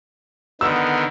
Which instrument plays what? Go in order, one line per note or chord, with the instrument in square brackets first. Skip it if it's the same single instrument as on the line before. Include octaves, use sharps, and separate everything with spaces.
[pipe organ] D3 D#3 B3 [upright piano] E6